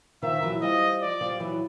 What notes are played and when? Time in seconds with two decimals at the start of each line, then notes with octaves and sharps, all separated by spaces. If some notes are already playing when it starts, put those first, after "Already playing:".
0.22 D#3 F3 E5
0.43 E3 F#3
0.62 F3 G3 D#5
1.01 D5
1.21 F3 G3
1.40 E3 F#3